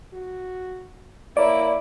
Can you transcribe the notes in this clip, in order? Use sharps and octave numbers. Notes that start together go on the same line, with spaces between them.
F#4
A#3 E4 A#4 C#5 D5